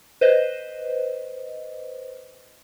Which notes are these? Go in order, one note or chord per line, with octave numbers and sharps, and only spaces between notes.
B4 C5 D#5